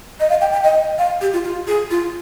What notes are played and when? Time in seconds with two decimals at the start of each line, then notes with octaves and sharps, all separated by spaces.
0.20 D#5
0.30 F5
0.41 G5
0.52 G5
0.64 D#5
0.99 F5
1.21 G4
1.33 F4
1.44 F4
1.67 G#4
1.91 F4